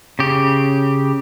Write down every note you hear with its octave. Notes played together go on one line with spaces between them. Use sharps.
C#3 G4